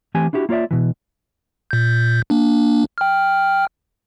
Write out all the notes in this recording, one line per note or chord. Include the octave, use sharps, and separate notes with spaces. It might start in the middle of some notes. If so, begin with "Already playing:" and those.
E3 A3 C4 G4 G#5
D4 E4 F#4 G4
A#3 F4 C#5 D5 E5
B2 E3
A#2 G6
A#3 D4
G5 F6